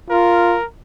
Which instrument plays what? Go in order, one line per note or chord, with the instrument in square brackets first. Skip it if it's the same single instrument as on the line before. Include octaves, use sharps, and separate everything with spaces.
[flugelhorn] F4 [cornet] A#4